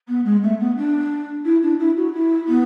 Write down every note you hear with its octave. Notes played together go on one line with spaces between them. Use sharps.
B3
G#3
A3
B3
D4
E4
D4
E4
F#4
E4
B3